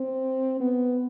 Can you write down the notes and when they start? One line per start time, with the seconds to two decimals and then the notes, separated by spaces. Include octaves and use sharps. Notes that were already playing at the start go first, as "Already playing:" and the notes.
Already playing: C4
0.60 B3